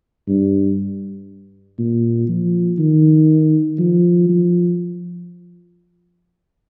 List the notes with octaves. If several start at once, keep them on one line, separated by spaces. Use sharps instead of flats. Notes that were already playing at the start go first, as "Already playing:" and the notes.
G2
A#2
F3
D#3
F3
F3